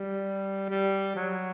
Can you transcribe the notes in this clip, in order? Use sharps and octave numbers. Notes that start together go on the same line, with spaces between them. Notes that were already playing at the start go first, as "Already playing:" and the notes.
Already playing: G3
G3
F#3